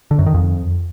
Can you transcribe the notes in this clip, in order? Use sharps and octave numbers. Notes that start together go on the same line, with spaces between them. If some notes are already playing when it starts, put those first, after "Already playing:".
D3
F#2
D#3
F2